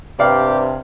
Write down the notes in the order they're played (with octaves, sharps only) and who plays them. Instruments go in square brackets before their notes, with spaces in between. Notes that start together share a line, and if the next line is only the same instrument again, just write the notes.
[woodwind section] G2 [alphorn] C3 [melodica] G4 [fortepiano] D5 F5